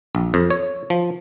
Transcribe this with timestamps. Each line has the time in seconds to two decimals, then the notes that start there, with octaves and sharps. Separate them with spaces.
0.15 A#1
0.34 F2
0.50 C#5
0.90 F3